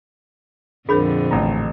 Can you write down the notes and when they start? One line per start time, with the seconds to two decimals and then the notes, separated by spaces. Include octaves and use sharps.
0.89 F2 A#2 D3 D4 G#4 A#4 C5 B5
1.31 A1 A#5